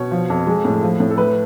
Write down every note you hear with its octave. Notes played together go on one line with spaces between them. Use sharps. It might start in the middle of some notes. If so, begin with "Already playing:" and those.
Already playing: B2 C#5
F3
F2
G#3
A2
F3
A2
A4
A3 B4